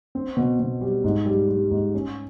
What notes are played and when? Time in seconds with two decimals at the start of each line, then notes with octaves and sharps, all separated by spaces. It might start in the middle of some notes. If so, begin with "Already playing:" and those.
0.15 C4
0.37 B2
0.60 B2
0.81 G3
1.04 G#2
1.26 G3
1.49 G3
1.71 G#2
1.94 C#4